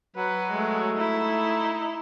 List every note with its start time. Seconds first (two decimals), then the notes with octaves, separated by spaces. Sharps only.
0.16 F#3 B4
0.51 G#3 A3
0.97 D#4 E4